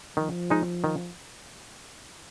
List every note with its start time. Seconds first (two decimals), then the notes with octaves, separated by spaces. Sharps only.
0.17 D#3 F3
0.50 G#3 D#4
0.84 D#3